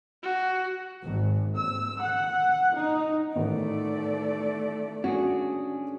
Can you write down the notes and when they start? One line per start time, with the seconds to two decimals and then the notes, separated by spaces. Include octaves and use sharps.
0.23 F#4
1.02 G#1
1.55 E6
1.99 F#5
2.74 D#4
3.36 A1 D#3 A3 D5
5.04 C#4 D4 F#4 G#4